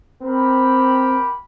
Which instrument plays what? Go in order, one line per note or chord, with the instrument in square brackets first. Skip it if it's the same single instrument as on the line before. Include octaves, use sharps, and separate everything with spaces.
[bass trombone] C4 [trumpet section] G4 A#4 B5